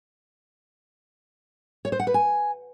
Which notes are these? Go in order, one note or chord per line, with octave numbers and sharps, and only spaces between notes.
C#5
C5
F#5
B4
G#5